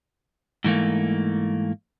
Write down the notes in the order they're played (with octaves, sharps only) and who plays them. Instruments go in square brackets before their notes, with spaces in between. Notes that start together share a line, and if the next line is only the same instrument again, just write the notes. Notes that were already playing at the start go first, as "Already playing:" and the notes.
[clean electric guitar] G#2 E3 A3 A#3